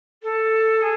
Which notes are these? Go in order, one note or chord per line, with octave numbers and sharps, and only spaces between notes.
A4
G#4